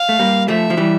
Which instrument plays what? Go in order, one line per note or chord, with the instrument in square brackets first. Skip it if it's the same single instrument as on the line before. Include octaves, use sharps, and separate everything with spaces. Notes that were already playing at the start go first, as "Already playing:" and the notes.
Already playing: [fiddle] F5
[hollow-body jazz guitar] A3
G3 A#3
[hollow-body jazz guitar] F3 A3 [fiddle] E5
[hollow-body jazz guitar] F3
E3 G3